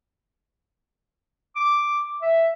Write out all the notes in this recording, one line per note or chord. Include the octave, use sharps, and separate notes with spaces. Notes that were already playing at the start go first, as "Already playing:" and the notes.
D6
E5